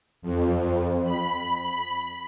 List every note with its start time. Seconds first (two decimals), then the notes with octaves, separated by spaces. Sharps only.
0.22 F2
1.05 B5